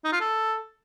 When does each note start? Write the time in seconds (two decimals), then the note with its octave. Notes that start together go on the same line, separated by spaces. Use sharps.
0.04 D#4
0.12 F4
0.21 A4